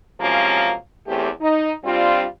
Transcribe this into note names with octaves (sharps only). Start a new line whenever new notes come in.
C3 F3 F#3 G#3 A#3 C#4
E2 A3 C4 C#4 G4
D#4
G3 C4 D4 F4